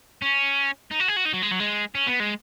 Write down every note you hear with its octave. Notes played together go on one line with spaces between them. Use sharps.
C#4
D#4
F#4
G#4
F#4
D#4
F#3
G#3
F#3
G#3
C#4
B3
G#3